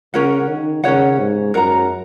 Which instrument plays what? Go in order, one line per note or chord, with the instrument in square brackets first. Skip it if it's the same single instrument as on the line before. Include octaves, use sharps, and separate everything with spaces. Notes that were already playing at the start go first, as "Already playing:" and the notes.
[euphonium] C#3 [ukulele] C#4 A#4 C#5 F#5
[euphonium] D#3
[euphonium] C#3 [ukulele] C#4 A#4 C#5 F#5
[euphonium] G#2
[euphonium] F#2 [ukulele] A#4 F#5 A#5